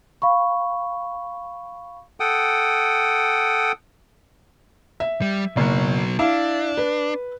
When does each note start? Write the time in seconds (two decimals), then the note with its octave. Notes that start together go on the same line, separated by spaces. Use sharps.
0.22 F5 B5 C#6
2.20 A4 F#5 G5 D#6
5.00 E5
5.22 G3
5.57 F#1 B2 F#3
6.19 D4 E4 E5 F5
6.77 B4